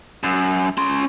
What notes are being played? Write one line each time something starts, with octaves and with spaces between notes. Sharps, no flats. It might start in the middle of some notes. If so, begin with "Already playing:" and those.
F#2
C#4 C6